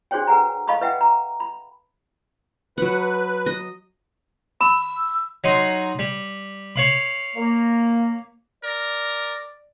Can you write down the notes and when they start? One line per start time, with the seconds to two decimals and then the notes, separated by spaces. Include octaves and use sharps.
0.11 D4 F#4 G#4 C5 C#5 G5
0.27 A4 B4 F#5 G#5 A#5
0.68 A4 D#5 F5 B5 C#6 D#6
0.81 B4 E5 F#5 G5
1.01 A#5
1.40 B5
2.78 F#3 B4 F#5
3.46 D#5
4.61 B5 E6
5.44 F#3 D#4 C6
5.99 G3
6.76 C#5 F5 B5
7.36 A#3
8.64 A#4 D5